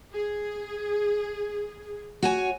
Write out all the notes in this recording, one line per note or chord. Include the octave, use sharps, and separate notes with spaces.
G#4
F#4 C#5 G#5